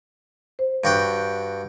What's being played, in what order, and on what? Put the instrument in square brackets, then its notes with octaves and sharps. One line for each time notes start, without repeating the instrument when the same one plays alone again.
[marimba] C5
[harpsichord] G2 F#4 G5